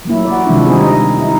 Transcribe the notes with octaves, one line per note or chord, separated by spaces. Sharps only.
F#3 A#3 E4
F#4 D5
C3 D#3 F3 G#3 D4 E4
D#3 G3 C4 D#4 G#4
D#5
D#4 E4